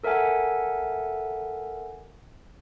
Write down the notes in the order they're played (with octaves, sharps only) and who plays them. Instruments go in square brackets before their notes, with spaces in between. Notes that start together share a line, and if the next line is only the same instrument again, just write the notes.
[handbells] A4 A#4 E5 F#5 G#5